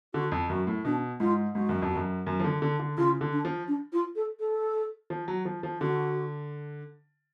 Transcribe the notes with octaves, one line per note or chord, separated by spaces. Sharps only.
D3 F#4
F2
F#2 F#4
A2
B2 D4
G#2 F4
G#2 F#4
F#2
F2
F#2
F#2
F3
D3
D3
D3
C#3 F4
D3
D4
F3
D4
F4
A4
A4
F3
F#3
F3
F3
D3 F#4